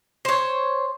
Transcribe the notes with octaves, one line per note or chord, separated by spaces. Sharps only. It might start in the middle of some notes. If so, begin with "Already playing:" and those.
C5 C#5